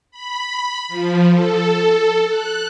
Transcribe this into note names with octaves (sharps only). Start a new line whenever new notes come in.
B5
F3
A4
F#6